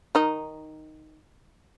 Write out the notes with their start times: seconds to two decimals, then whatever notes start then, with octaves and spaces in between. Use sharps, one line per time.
0.15 D#3 D#4